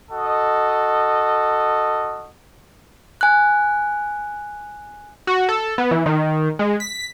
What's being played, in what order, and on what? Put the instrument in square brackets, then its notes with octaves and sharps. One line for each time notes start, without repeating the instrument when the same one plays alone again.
[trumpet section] F#4 A4 D#5
[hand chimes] G#5 F#6
[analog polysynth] F#4
A4
B3
E3
D#3
G#3
B6